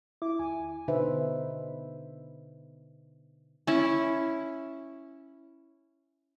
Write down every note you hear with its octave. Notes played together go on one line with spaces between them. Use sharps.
E4 D6
D2 G#5
B2 D3 D#4 B4 C5 E5
C#4 E4